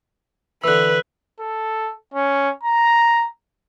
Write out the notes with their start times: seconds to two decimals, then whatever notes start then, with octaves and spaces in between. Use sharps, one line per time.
0.64 D3 E3 B4 E6 F#6
1.40 A4
2.14 C#4
2.63 A#5